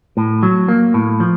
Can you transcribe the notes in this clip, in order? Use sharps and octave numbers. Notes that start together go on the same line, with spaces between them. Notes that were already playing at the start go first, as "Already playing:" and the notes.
A2
F#3
A#3
A2
F3